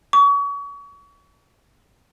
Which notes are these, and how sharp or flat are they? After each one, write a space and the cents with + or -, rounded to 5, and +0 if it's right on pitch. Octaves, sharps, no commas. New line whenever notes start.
C#6 +35